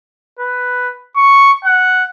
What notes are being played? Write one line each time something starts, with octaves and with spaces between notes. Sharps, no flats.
B4
C#6
F#5